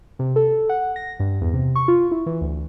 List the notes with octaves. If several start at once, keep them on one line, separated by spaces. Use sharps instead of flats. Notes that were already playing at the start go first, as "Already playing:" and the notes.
C3
A4
F#5
A#6
G2
E2
C3
C#6
F4
E4
E3
D2